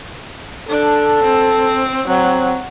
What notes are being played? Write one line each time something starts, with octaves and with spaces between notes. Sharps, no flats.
D4 A4
C4
F#3 C4